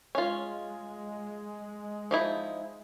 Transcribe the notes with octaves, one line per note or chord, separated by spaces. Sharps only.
G#3 C#4 F4
F3 D#4 E4